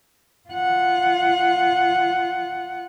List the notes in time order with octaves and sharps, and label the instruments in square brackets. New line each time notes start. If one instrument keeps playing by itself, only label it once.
[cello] F4 F#5